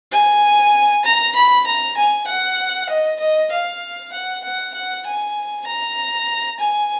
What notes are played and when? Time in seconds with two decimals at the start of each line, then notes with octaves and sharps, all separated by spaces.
0.12 G#5
1.05 A#5
1.35 B5
1.66 A#5
1.97 G#5
2.27 F#5
2.89 D#5
3.20 D#5
3.51 F5
4.12 F#5
4.44 F#5
4.74 F#5
5.06 G#5
5.66 A#5
6.59 G#5